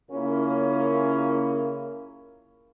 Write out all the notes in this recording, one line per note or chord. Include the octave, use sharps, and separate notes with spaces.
C#3 A#3 C#4 E4 F4 A#4